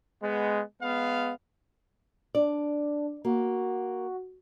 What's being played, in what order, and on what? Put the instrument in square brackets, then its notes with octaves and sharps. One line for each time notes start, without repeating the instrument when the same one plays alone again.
[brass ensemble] G#3 B3
G#3 B3 F5
[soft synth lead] D4 [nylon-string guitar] D5
[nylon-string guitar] A#3 [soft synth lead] F#4